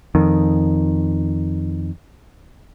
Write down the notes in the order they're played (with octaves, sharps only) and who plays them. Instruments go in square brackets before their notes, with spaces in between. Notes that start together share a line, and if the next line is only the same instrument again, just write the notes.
[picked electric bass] F2 D#3